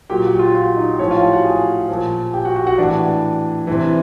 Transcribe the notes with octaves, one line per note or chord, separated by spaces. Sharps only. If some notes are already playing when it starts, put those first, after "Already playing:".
A#2 F#3 G4 G5
F#4 F#5
F4 F5
F4 F5
D#4 D#5
A2 F3 C#4 C#5
F4 F5
G4 G5
F#4 F#5
G#4 G#5
A#2 F3
G4 G5
F#4 F#5
F#4 F#5
F#4 F#5
A2 E3 D4 D5
C3 E3